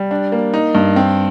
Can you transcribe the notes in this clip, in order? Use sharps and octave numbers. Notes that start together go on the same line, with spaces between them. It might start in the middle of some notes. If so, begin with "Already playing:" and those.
Already playing: G3
D4
A#3
D#4
G2
C4